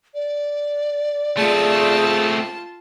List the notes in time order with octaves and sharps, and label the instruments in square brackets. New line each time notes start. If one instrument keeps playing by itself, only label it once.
[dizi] D5
[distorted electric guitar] A3 C4 [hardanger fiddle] F4 A5 [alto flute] G#4